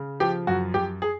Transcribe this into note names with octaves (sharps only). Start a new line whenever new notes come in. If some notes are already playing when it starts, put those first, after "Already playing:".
Already playing: C#3
F3 G4
F#2 F#4
F#2 G4
G#4